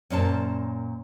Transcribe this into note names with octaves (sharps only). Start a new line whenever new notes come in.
F#2 A#2 C#4 C5 A5